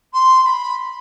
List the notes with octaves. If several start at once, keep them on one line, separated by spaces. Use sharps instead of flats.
C6
C6
B5